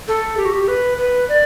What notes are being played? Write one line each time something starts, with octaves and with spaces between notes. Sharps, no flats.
A4
G4
F#4
G4
B4
B4
D5